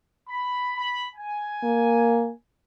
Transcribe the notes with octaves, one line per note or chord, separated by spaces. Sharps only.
B5
B5
G#5
A#3